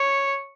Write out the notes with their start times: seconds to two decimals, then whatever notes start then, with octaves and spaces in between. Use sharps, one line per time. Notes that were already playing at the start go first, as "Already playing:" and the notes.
Already playing: C#5